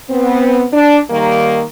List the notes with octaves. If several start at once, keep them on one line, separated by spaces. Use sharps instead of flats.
B3 C4
D4
D#3 G3 A#3